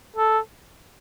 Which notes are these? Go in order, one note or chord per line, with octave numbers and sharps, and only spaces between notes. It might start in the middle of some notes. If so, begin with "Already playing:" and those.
A4